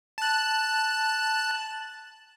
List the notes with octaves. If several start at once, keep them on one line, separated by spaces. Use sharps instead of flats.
A5 F#6